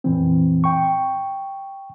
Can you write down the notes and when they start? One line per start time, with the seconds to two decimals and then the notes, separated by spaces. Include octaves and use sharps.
0.04 F2 A#2 E3 C4
0.64 G5 C#6